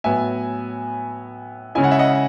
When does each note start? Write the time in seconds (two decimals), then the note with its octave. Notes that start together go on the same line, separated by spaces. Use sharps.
0.04 A2 F#3 B3 E5 G#5
1.75 C#3 G#3 C#4 E4 G#5
1.84 F#5
1.91 E5
1.99 D#5 F#5